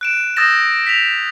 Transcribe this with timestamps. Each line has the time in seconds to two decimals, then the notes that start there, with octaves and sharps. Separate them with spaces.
0.01 F#6 D7 E7
0.37 D#6 E6 G6 A6 A#6 E7
0.87 B6 F7